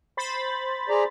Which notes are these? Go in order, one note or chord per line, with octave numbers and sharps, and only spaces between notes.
C5 B5 A6
G#4 D5 A#5